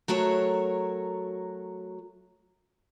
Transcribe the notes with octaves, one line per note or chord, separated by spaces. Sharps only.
F#3 A3 F#4 A#4 C#5